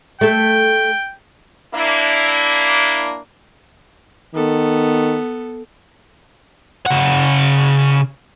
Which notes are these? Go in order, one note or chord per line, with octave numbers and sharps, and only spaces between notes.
A3 A4 G5
A#3 D4 E4
D#3 B3 A4
C#3 F#5